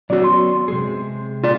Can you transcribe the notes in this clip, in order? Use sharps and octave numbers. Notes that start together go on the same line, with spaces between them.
F#3 B3 C#4 F#4 D5
C6
C3 G#3 G#4
F4 D5